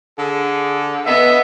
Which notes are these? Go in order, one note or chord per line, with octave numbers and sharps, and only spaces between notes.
D3 G#4
B3 D#5 E5